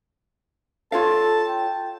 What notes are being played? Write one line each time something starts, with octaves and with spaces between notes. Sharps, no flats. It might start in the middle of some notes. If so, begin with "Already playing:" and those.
F4 A4 C#5 F5 A5
G5